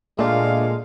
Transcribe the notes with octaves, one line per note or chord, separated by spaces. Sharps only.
A#2 G#3 A3 D4 F4 F5